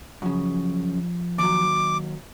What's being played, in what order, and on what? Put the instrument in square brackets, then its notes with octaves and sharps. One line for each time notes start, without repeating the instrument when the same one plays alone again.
[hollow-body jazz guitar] F#2 C#3 [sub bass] F3
[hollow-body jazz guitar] D#2 F#3 [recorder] D6